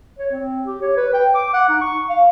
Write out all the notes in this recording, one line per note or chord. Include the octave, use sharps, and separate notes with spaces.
C#5
C4
G4
C#5
B4
G5
D6
F#5
D#4
C#6
F5